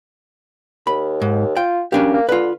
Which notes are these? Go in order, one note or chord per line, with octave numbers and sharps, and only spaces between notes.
D#2 B5
G#2
F4 G5
A#3 C#4 D4 G4
A#3
D3 F4 B4